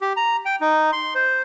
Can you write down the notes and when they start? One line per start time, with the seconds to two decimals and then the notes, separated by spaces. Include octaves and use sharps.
0.01 G4
0.17 A#5
0.46 G5
0.61 D#4
0.92 C6
1.15 C5